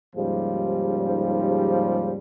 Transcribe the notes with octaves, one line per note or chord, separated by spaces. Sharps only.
D#2 G#2 C#3 F3 G3